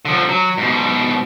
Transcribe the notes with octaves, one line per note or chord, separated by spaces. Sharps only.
D3 F3
F#3
G#2 B2